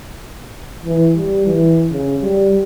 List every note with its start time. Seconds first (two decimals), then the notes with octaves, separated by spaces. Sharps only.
0.85 E3
1.14 G3
1.46 E3
1.90 C#3
2.22 G3